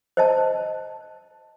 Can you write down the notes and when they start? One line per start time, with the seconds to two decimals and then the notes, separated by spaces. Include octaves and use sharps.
0.17 C5 D#5 A5